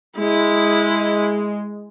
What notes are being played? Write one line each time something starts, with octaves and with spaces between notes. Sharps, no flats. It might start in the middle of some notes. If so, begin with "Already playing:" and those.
G#3 E4